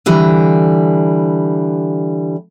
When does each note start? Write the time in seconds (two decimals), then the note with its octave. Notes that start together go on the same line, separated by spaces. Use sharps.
0.06 D3 E3 G3